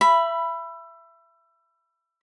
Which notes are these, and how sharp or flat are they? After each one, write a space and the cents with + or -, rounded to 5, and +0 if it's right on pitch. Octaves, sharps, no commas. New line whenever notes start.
E5 +25 B5 +0